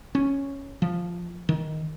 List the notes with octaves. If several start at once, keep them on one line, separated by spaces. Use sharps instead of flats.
C#4
F3
D#3